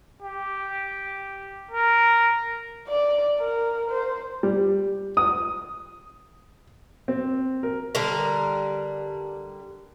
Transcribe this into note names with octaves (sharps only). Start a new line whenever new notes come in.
G4
A#4
D5
A#4
C5
G3
D#6
C4
A#4
D3 G3 A#4